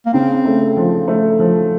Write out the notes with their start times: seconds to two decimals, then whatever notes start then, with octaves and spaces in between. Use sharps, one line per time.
0.06 A#3
0.14 C#3 C4
0.45 A3
0.77 F3
1.08 A3
1.40 F3